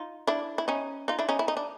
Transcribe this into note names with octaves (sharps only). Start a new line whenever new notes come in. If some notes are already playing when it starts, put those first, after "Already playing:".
Already playing: D#4 F4
D4 E4
E4
C#4 D#4
D#4 F4
D4 E4
C#4 D#4
E4
D#4
D4